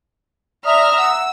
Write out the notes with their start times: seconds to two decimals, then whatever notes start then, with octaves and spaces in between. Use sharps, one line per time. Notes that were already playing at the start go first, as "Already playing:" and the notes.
0.65 D5 E5 A#5 D#6 F6
0.98 F#5 E6